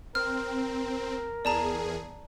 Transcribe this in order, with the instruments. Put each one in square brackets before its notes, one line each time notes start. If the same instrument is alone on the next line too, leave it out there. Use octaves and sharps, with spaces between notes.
[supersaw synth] C4 [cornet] A#4 [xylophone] F6
[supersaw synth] E2 G#4 [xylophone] D5 A5 A#5